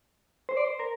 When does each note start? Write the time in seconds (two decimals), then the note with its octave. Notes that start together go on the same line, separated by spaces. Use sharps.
0.49 C5
0.57 D5
0.64 C5
0.79 A#4